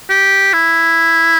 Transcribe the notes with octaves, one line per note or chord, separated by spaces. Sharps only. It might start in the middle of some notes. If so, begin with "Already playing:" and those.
G4
E4